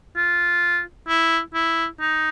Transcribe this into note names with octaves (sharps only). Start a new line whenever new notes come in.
F4
E4
E4
D#4